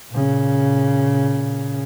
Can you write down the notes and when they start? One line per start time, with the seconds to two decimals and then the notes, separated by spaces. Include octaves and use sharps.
0.11 A#2 C#3